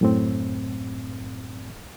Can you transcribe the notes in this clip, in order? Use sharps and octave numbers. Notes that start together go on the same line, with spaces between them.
F#2 A2 C4